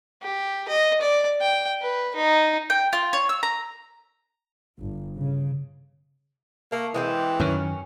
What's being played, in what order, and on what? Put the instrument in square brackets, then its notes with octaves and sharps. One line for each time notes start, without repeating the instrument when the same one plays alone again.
[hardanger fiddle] G4
D#5
D5
G5
B4
D#4
[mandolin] G5
F4
C#5
E6
A#5
[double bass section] G1
C#3
[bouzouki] A3 [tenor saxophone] A#3
[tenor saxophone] E3 [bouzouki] G#3 C4 G4
[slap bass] F#2 D#3 [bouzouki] C#4